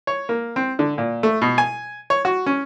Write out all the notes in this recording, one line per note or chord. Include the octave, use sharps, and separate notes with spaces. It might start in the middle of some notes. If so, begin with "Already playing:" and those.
C#5
A#3
C4
D3
A#2
A3
B2
G#5
C#5
F#4
C#4